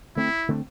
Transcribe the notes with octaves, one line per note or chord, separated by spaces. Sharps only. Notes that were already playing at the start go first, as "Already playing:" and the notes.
D3 A3 C4 E4
D3 A3 C4